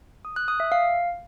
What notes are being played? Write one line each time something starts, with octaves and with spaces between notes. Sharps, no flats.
D#6
F#6
D#6
E5
F5